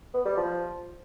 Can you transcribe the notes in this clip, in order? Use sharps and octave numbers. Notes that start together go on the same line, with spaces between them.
B3
G3
F3